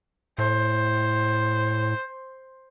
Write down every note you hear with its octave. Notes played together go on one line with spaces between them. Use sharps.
A2 C5